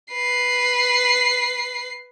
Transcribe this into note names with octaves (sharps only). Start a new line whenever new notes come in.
B4 C7